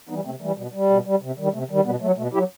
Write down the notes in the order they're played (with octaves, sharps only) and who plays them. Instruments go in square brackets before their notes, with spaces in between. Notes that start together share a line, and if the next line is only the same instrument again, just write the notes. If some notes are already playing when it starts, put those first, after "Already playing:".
[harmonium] E3 G3 B3 D#4
C3 A3 C4
E3 G3 A3
B2 G3
G3
B2
G3
C3
D#3 G3
C3 A3
D#3 G3
B2 G3 B3
F#3 A3
B2 A3
F#3 E4 G4